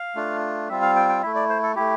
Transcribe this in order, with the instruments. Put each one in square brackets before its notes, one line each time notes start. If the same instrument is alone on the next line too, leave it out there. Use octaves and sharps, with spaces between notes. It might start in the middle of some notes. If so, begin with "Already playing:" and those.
Already playing: [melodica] F5
A3 D4 F4
G3 C4 F4 E5
F5
G5
G5
A3 E4 E5
D5
C5
A4
A3 E4 G4